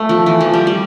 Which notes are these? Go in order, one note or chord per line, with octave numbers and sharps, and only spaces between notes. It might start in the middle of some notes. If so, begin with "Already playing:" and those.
Already playing: A3
F3
E3
F3
G3
G3